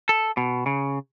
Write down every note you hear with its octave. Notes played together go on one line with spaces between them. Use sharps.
A4
B2
C#3